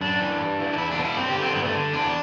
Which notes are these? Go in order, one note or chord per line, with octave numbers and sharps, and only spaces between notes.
F#2 D4
E3
G2
E3
D4
E2 E4
D4
B2
E4
G2 C4
G4
D3
C4
G2 B3
A3
D3
E2 D4